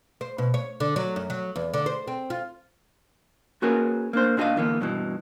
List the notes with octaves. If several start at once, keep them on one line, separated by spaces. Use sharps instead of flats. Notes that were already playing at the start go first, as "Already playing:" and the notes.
C5
B2
C#5
D3
F#3
F#2
F#3
E2
D3
C5
C4
F4
A#3 C#4 F#4 G#4 A#4 B4
A#3 D4 C5
A#2 D4 F#4 A#4 D#5 F5
D3 E3 A#3 B3
G2 B2 E3